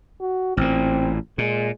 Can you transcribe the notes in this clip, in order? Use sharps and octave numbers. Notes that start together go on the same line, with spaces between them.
F#4
A1 A#2 C4
A#2 G#3